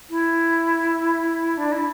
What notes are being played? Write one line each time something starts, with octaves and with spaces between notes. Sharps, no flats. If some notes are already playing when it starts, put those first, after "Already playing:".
E4
D4
E4